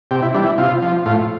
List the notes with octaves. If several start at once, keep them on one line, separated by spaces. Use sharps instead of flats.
C3 G4
E4
E3 G3 D4
E4
C3 F4
F3
A2 F4